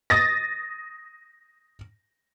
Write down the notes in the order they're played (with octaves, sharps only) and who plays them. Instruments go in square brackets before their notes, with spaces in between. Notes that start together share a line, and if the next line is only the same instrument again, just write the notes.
[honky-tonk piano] D#6 A6 A#6